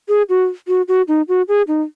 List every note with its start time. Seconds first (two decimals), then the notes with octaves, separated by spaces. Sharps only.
0.09 G#4
0.29 F#4
0.68 F#4
0.88 F#4
1.08 D#4
1.28 F#4
1.48 G#4
1.68 D#4